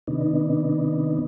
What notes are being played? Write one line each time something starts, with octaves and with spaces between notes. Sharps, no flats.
C3 D#3 B3 D4 D#4